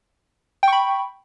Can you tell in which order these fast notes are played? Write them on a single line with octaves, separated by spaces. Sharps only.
G5 C#6 B5